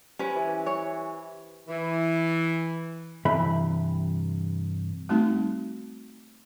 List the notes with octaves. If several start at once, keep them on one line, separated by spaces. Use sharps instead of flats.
C#4 G4 B4 C5 G#5
E3
C#5
E3
G2 C3 E3 E5 B5
G3 A3 B3 C4 D#4 F#4